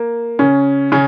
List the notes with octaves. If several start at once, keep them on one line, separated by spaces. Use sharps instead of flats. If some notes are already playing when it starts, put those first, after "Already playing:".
Already playing: A#3
C#3 C#4
C#3 C#4